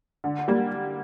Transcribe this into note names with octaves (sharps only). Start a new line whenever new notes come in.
D3
G3 A#3